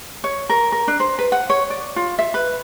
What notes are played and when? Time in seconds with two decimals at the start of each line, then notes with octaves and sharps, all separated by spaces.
0.24 C#5
0.50 A#4
0.72 A#4
0.88 D4
1.00 C5
1.19 B4
1.32 F#5
1.50 C#5
1.70 D5
1.96 F4
2.18 E5
2.34 B4